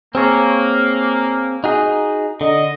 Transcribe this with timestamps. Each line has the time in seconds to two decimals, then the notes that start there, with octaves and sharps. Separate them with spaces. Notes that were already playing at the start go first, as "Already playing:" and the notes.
0.15 A#3 C4 G#4 C#5
1.64 D#4 F#4 G#4
2.41 D3 D#5